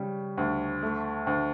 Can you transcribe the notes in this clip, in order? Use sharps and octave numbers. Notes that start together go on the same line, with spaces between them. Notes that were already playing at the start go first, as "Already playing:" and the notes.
Already playing: C#3 G3
D2
A3
D2